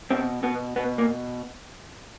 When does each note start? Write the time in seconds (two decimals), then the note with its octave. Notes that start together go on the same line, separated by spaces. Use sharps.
0.11 B2 C4
0.43 B2 B3
0.76 B2 B3
0.98 A#3